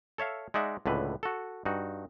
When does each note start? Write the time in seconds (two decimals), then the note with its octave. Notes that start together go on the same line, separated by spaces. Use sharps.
0.18 A4 C#5 E5 F5
0.54 G#3 D#4 D5 E5 F#5
0.86 C#2 A2 D3 B4
1.23 F#4 A4
1.65 G2 D#4 F#4